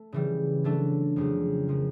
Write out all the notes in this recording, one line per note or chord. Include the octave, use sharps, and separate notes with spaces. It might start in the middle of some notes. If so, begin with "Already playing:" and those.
Already playing: A3
C#3 E3 G3
F#3 A3 D4
F2 C#3 F#3
C#3 F3 A#3